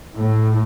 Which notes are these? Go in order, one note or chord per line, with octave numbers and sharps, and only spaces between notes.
A2